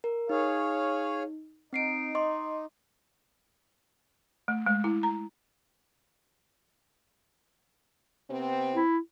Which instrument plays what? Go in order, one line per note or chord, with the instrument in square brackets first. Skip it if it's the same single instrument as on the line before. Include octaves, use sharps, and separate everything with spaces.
[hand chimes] A#4
[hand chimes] D#4 [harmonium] G#4 C#5 F5
[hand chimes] C4 C7 D7 [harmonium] D#4
[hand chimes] D#5 C6 D6
[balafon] A3
G#3
E4
A#5
[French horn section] C3 B3 C4
[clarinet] E4